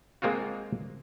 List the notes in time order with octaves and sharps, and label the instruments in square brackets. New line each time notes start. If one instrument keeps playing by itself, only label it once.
[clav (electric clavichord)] G#3 A#3 C4 F4 F#4